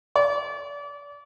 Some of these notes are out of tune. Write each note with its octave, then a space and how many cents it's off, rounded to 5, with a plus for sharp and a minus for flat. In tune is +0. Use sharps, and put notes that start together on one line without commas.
D5 -30